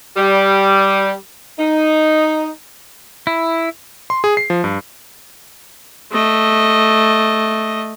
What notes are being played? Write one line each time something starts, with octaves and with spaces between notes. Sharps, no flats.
G3
D#4
E4
C6
G#4
C7
F3
G2
A3 D#5